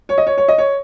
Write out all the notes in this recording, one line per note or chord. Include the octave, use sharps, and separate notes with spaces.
C#5
D#5
C#5
C#5
D#5
C#5